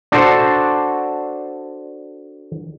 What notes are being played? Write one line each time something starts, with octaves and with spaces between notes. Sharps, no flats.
D4 F#4 A4 C5